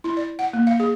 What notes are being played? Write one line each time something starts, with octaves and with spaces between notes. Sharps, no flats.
E4
D5
F#5
A#3
F5
G#4